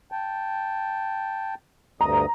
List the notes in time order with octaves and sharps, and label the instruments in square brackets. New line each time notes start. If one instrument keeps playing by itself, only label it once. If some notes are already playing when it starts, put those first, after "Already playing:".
[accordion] G5 A5
[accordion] D2 G2 D#6 [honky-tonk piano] A#5